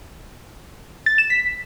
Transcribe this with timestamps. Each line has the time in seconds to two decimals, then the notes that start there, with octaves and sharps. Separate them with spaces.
1.06 A6
1.18 E7
1.30 B6